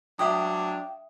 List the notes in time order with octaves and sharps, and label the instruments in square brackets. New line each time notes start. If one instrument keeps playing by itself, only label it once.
[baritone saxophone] F#3 [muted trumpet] D4 [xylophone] E5 D#6 [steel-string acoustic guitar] F5 G5